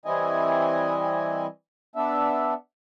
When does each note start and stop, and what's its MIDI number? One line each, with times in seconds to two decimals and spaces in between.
0.05 1.46 52
0.05 1.46 55
0.05 1.46 60
0.05 1.46 64
0.05 1.46 75
0.05 1.46 80
1.96 2.54 59
1.96 2.54 62
1.96 2.54 76